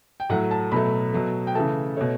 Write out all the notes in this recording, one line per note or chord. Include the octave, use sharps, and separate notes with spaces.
G5
A2 F#3 A3 F#5
A5
B2 F#3 A3 B5
B2 F#3 A3
G5
C#3 E3 A3 A5
B2 A3 C#5